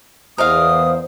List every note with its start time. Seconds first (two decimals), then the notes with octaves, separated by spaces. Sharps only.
0.38 E2 A#4 C5 D#5 F5 D#6